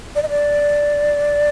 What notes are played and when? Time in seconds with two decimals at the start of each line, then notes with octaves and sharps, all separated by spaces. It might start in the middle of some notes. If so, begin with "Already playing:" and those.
0.16 D5
0.23 D#5
0.30 D5